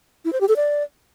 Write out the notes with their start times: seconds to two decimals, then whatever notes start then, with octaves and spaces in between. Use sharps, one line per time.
0.25 E4
0.33 C5
0.41 G4
0.48 A4
0.56 D5